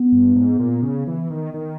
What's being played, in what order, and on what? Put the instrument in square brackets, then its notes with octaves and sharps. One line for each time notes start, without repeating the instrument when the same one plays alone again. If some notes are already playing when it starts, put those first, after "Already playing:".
Already playing: [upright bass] B3
[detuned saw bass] G2
G#2
A#2
C#3
E3
D#3
D#3